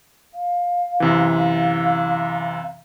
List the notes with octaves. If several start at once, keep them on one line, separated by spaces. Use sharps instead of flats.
F5
F#2 C3 E3